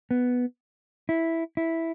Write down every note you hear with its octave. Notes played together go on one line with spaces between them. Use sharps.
B3
E4
E4